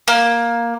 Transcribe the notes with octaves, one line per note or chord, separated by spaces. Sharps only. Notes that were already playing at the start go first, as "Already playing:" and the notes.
A#3